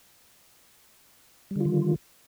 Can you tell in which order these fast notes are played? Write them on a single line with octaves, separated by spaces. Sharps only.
G3 D3 F4 D#3